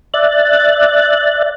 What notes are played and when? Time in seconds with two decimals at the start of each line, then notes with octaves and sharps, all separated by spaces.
0.14 D5 E5 F#6 A6